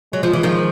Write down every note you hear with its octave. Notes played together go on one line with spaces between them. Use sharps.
F#3 G#3
F3
E3
D#3 F3